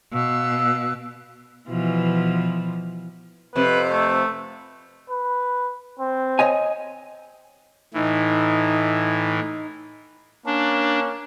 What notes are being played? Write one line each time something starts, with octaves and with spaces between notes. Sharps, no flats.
B2 F5 E6 F#6
B2 E3 F3
F2 C3 B4
A3
B4
C4
C#5 D#5 G#5
A2 E3 D#4
A#3 C#4 D4